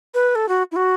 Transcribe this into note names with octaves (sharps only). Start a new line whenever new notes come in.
B4
A4
F#4
E4
F#4